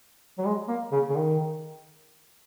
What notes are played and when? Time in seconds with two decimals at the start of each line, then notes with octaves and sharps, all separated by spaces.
0.38 F#3
0.45 G#3
0.68 A#3
0.92 C#3
1.10 C#3
1.16 D#3